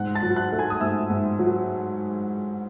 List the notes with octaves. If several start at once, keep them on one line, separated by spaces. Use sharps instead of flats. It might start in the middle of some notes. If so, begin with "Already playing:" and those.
Already playing: G#2 F#5 F#6
A5 A6
F#3
F#5 F#6
A3
G#5 G#6
D#6
G#2 E5 E6
G#2
F#3